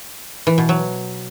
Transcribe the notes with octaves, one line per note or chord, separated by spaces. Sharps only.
E3
B2
F#3